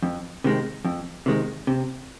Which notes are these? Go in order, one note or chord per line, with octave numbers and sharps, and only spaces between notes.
F2
C3 D#3 G#3
F2
C3 D#3 G#3
C3